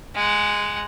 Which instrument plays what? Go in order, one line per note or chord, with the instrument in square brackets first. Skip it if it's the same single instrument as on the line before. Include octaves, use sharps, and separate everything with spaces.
[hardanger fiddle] G#3 F#5